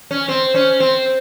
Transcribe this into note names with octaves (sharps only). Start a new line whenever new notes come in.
C#4
C4
C#4
C4